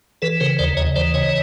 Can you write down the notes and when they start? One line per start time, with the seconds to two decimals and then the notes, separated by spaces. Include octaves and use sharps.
0.22 E3 A4 B4
0.40 C#3 A#4 C5
0.59 D#2 C5 D5
0.77 D#2 C#5 D#5
0.96 E3 C5 D5
1.14 C#3 C#5 D#5